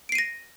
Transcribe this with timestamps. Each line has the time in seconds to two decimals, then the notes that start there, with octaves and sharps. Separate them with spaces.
0.09 D7
0.12 C7
0.15 D#7
0.18 A#6